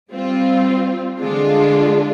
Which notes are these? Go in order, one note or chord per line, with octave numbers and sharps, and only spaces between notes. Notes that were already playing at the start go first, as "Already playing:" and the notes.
G3 C4 F4
D3 G#3 D4 F4